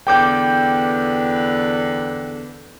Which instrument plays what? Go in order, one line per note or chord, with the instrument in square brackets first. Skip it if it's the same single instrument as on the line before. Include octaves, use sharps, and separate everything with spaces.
[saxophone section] E2 D3 B4 [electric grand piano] G5 D6 G6